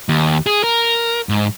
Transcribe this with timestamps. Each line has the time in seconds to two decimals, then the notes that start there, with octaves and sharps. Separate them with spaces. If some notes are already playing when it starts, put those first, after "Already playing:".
0.09 D#2
0.46 G#4
0.64 A#4
1.29 G#2